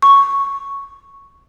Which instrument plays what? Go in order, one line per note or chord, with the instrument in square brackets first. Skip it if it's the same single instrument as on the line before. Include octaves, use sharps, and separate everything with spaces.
[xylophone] C#6